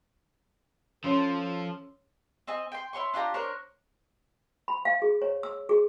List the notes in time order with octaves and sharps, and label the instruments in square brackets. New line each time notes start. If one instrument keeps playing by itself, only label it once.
[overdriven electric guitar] F3 [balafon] C#4 [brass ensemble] A4 [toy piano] C#5 C6 E6
[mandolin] C4 D#5 G#5
G5 C6
E4 C#5 C6 C#6
D4 F4 G4 A#5
D4 A#4 C5 C#5
[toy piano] B5
F5
G#4
C#5
E6
G#4